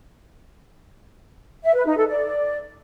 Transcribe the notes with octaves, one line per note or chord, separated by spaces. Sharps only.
E5
B4
D#4
A4
D5